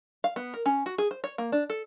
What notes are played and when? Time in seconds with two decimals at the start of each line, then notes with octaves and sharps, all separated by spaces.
0.24 F5
0.36 B3
0.54 A#4
0.66 C#4
0.86 F#4
0.98 G#4
1.11 C5
1.24 C#5
1.38 A#3
1.52 D4
1.70 A4